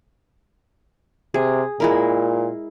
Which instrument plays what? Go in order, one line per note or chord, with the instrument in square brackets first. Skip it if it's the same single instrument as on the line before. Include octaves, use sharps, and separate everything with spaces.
[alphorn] C3 [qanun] G#4
[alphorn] A#2 [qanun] G#3 E4 A#4